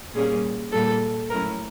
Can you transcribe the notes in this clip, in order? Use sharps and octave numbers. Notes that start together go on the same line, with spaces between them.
A#2 G3 A#3 C#4 G#4
A#2 G3 A#3 A4
A2 F#3 A3 C#4 E4 A#4